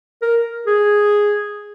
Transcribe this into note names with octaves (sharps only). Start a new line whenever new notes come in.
A#4
G#4